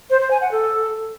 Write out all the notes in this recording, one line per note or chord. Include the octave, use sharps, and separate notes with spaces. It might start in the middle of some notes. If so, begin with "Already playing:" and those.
C5
C5
G#5
F#5
A4